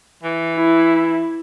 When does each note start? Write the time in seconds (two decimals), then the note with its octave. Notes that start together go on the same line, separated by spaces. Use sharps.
0.23 E3
0.56 E4